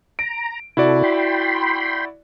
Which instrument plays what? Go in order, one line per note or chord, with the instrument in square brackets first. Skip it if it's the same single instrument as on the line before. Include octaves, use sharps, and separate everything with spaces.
[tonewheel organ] A#5 [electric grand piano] D7
[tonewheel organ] C3 A4 [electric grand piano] E4 F#4 D5
[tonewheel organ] G5 B5 C6